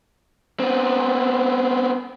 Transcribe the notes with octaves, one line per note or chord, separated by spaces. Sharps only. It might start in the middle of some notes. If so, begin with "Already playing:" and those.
B3 C4